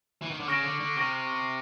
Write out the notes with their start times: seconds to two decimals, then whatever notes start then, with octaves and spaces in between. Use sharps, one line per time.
0.22 E3
0.31 D#3
0.40 D3
0.48 C#3 C#6 F6 A#6 D7
0.63 D3
0.81 D3
0.96 C3 C#6 F6 A#6 D7